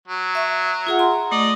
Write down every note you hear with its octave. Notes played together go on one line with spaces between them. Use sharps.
F#3
E5 C#6
F4 G#4 F#5
A#5 C6
A3 D5 D#5